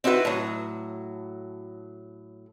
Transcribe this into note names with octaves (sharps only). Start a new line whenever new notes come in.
C4 D#4 E4 F#4 B4
A2 F#3